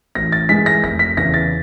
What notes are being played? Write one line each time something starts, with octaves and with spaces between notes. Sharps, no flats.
A1 A#6
A6
G#2 E3 G#3 B6
A#6
F1 A#6
B6
E2 C#3 E3 A#6
A6